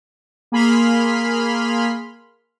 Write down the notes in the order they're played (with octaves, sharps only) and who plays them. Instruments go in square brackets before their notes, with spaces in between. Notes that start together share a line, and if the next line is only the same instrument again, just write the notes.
[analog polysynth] A#3 G#4 B5 C6 F6